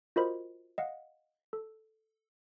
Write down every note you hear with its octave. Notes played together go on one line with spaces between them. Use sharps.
F4 F#4 A#4 C5 D#5 B5
D#5 F5 F#5
A4